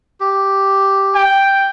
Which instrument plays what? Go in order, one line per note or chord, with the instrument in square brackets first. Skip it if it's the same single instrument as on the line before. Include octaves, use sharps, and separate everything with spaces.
[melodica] G4
[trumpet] G5